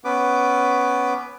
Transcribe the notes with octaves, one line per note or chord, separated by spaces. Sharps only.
B3 C#4 B4 D6